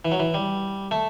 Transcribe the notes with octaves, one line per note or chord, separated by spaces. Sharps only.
E3
F#3
E3
G3
A3